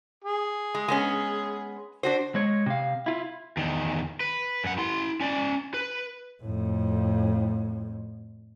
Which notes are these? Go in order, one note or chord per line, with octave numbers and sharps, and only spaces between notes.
G#4
G#3
G#3 B3 C#4
D4 F#4 C5
G#3 C#5
C3 F5
E4 F4
E2 D#3
B4
F#2 F#5
E4 C6
C#4 D5
B4
F2 A2